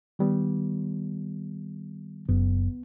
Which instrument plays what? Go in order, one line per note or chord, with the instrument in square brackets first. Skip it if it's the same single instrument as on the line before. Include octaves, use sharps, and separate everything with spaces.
[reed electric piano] D#3 G3 B3
[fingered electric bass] F#1 [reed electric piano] C2 B3